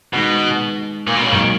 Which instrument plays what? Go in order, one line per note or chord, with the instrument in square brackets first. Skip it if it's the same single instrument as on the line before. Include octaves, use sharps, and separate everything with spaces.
[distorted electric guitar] B2 [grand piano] D#3 G#3 D#4
[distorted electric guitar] A#2
B2
C#3
[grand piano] G#2 F#3 A#3 D#4 [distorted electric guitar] D#3